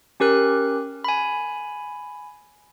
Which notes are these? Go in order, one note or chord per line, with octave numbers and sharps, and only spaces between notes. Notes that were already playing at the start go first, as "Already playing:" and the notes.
C#4 G4 A#4 F#6
G#5 B5